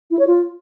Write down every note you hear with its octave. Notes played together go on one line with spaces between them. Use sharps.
E4
C#5
F4